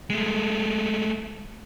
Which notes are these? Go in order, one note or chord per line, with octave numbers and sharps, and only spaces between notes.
G#3 A3